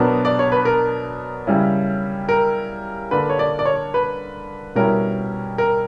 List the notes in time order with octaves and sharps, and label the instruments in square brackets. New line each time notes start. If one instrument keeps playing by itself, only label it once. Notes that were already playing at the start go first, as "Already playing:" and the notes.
Already playing: [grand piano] B2 F#3 B3 D4 [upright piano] A#4
[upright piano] D5
C#5
B4
A#4
[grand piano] C#3 G3 C#4 E4
[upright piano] A#4
[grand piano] D3 A#3 D4 [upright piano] B4
[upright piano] C#5
D5
D5
C#5
B4
[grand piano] B2 G3 C#4 E4 [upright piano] A#4
[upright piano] A#4